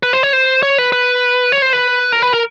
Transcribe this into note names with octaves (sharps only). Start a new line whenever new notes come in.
B4
C5
C#5
C5
C#5
B4
B4
C#5
C5
B4
A#4
B4
A#4